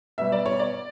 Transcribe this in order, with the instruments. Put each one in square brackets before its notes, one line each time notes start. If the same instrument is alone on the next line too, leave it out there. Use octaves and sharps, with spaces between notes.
[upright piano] B2 G3 E5
D5
C#5
D5